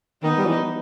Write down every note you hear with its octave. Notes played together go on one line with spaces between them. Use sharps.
D#3 B3 D#4
G3
E3